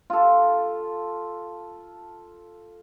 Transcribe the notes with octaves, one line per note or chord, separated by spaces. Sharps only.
F4 A4